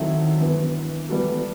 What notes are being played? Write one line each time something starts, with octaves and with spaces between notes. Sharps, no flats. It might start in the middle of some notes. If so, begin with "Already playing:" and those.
Already playing: D#3 F#3 C4 E4 A4
G2 E3 B3
E3 G3 B3 F#4 A4